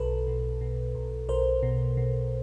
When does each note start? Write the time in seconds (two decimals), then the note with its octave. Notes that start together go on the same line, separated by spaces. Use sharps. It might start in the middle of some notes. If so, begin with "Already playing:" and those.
Already playing: B1 A4 B4
0.27 B2
0.61 B2
0.95 B1
1.29 B1 A#4 C5
1.63 B2
1.97 B2